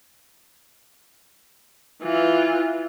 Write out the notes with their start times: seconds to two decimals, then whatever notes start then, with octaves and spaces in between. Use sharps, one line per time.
2.02 E3 F4